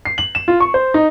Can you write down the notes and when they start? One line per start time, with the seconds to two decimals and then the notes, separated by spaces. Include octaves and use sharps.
0.05 C7
0.18 F#7
0.35 E7
0.48 F4
0.60 C#6
0.74 C5
0.94 D#4